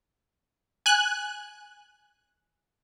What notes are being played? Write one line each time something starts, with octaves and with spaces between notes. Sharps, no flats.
G#5 F#6